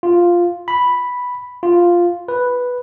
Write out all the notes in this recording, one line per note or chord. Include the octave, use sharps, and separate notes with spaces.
F4
B5
F4
B4